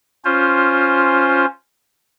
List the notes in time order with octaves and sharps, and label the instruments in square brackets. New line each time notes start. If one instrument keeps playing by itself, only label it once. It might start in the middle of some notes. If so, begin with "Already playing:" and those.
[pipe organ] C#4 F4 C5